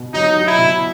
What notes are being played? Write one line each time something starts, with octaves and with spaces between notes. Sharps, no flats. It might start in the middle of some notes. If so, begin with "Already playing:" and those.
Already playing: B2
F#3 D#4
F#3
E4
B2